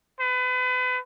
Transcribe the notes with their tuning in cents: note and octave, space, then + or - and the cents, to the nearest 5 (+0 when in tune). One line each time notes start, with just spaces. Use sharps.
B4 +35